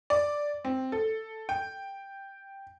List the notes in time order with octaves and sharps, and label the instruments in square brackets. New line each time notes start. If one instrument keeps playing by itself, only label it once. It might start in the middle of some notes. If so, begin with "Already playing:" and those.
[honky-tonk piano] D5
C4
A4
G5